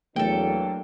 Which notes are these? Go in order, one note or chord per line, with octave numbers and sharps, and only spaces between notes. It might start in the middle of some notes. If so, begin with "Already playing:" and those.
E2 F#3 A3 A#3 D4 A4 G5